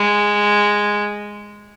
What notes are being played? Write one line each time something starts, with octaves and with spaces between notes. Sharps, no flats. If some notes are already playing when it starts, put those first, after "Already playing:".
Already playing: G#3